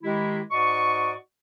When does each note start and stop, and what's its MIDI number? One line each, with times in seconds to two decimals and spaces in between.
0.03 0.41 51
0.03 0.41 56
0.03 0.41 64
0.03 0.41 67
0.51 1.13 44
0.51 1.13 66
0.51 1.13 74
0.51 1.13 75
0.51 1.13 85